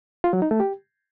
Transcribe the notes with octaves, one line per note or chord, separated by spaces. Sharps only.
F4
F#3
D#4
A3
G4